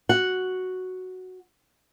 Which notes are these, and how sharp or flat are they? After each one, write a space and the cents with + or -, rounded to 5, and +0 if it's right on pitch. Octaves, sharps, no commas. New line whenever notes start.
F#4 +0 F#5 +0